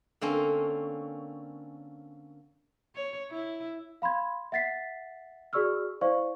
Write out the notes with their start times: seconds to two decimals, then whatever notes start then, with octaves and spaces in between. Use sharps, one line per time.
0.21 D3 A#3 C4 C#4
2.95 C#5
3.32 E4
4.02 F5 B5 C6 G#6
4.52 E5 F#5 A6 B6 C7
5.53 F#4 G#4 D5 C#6 E6 F6
6.01 E4 C5 D5 F5 C#6